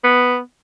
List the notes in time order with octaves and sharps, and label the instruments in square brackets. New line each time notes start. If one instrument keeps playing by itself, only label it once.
[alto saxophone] B3